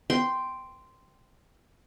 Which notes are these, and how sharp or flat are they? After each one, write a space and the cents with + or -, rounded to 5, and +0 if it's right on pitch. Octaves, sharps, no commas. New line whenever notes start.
G5 +0 C6 -5